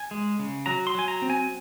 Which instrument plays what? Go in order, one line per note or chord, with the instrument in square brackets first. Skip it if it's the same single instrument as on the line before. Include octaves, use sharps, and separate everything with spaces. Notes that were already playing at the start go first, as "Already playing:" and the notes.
Already playing: [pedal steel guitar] G#5
G#3
C#3
F#3 A#5
C6
F#3 G#5
A#5
C4
G#5